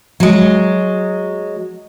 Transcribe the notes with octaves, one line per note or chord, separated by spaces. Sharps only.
F#3 G#3